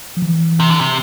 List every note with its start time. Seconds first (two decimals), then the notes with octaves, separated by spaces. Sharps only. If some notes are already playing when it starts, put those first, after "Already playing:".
0.17 F3
0.22 E3
0.60 C3
0.71 D3
0.81 C3